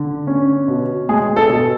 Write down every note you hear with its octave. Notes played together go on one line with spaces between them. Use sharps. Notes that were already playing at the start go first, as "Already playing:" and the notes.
Already playing: D3
C#4
B2
G#3 G#4
A4
B2